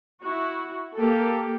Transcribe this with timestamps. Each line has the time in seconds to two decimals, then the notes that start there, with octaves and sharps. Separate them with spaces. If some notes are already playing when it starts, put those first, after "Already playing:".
0.22 E4 F#4
0.95 A#3 G4 A4